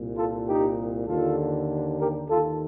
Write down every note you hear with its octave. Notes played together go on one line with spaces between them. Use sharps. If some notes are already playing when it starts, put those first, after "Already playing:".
Already playing: C2 A#2
F4 A4
D#4 G4
D#2 D3 F4 A4
G4 A#4
D#2 D#3 F4 A4